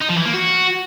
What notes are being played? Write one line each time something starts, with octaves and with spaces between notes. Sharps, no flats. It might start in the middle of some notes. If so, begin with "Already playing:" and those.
D#4
F3
E3
A#3
F#4